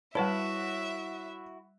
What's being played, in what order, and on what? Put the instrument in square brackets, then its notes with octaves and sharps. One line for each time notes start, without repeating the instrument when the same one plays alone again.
[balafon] G3 B4 A5 [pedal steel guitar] E4 F#4 [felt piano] C#5 F#5 [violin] E5